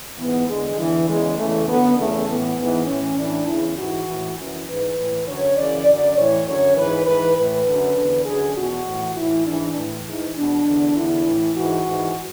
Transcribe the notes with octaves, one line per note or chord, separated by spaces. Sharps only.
G#2 E3 B3
E2 D3 G#3
E2 D3 E3
E2 C#3 E3 G#3
E2 C#3 E3 A3
F#2 D3 B3
E2 C#3 E3 A3
A2 E3 B3
G#2 E3 B3
A2 E3 C#4
A2 E3 D4
E2 C#3 E3 E4
G#2 E3 F#4
A2 E3
F#2 E3
G#2 E3 B4
A2 E3
F#2 D3 C#5
F#2 C#3 E3 D5
F#2 D3 D5
A2 E3 C#5
F#2 D3 C#5
G#2 E3 B4
G#2 E3 B4
A2 E3 B4
F#2 D3
E2 D3
F#2 D3 G#4
E2 B2 F#4
A2 E3
A2 E3 E4
G#2 E3 D4
A2 E3
G#2 E3
E2 B2 D4
E2 D3
E2 D3 E4
A2 E3
G#2 E3 F#4
G#2 E3